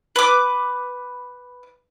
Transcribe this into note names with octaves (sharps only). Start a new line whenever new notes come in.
B4 D6